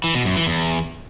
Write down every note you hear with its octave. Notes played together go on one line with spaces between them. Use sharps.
E3
B2
F#2
E3
E2